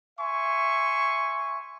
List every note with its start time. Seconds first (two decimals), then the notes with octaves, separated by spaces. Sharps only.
0.19 E5 G#5 C6 C#6